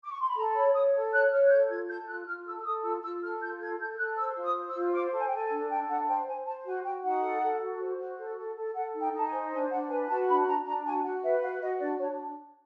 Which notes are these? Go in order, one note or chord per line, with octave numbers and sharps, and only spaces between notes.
D6
C#6
C6
B5
A4 A#5
C#5 B5
C#5 D#6
A4
C#5 F#6
C#5 F6
F#6
A4 G6
F4 G#6
A4 G6
F4 F#6
F4 F6
A4 E6
E6
A4 D#6
F4 E6
F4 E6
A4 F6
F4 G6
A4 G#6
A4 G6
A4 F#6
C5 E6
F4
D#6
C5
E6
F4
C5 D6
A4
G#5
G5
A4 G#5
G#5
D4
A4 G5
D4 F#5
C5 G5
C5 G#5
C5 A5
F#4 G#5
F#4 G5
D#4 F#5
A4
A4
F#4
C5
F#4
A4
A4
A4
A4 F#5
D#4
G5
D#4 A5
G#5
C5
D4 G#5
D4 F#5
B4 G#5
F#4 A5
D4 B5
D4 A#5
D4 A#5
F#4 G#5
F#4 F#5
B4 E5
F#4 F5
F#4 D#5
D4 D5
D4 C#5